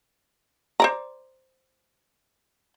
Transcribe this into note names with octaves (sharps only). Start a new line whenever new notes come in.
C5 D5 A#5